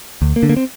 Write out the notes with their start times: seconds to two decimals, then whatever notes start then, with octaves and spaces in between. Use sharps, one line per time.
0.22 D2
0.36 A#3
0.43 D3
0.50 A#3
0.56 C4